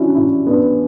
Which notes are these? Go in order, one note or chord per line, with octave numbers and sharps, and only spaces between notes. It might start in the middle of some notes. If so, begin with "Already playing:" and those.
Already playing: C#4 D4 E4 F#4
C#4 E4
B3 D4